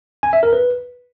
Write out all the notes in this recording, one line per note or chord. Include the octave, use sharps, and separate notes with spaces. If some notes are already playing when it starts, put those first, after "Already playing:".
G#5
E5
A#4
B4